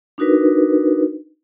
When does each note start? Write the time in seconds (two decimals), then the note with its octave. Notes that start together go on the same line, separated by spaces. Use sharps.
0.18 D4 D#4 F#4 A#4 B4